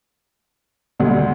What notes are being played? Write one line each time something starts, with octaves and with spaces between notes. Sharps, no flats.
D2 D3 G3